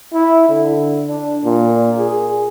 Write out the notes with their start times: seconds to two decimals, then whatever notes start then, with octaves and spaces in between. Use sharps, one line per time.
0.14 E4
0.48 D3
1.08 D4
1.45 A#2
1.99 G#4